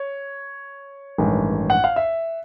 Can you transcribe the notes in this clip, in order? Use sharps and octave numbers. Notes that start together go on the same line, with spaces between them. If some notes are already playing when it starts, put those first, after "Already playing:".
Already playing: C#5
A1 G2 D#3 G#3
F#5
F5
E5